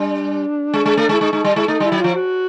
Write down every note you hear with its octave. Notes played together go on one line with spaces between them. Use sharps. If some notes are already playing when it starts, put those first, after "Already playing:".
Already playing: G3 D4
G#3
G#3
A3
G#3
E4
G#3 D#4
G#3 D#4
G3
G#3 E4
A3 D#4
G3
E4
F#3
F3 F4
F#4